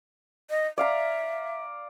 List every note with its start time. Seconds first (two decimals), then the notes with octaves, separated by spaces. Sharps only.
0.50 D#5
0.78 D5 E5 F5 A#5